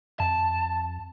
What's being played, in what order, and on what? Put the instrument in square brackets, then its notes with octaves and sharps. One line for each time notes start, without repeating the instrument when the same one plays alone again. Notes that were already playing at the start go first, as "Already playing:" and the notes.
[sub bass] F2 [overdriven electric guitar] A5